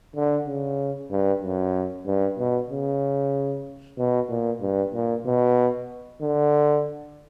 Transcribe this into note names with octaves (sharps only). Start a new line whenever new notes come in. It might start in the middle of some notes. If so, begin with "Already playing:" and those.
D3
C#3
G2
F#2
G2
B2
C#3
B2
A#2
G2
A#2
B2
D3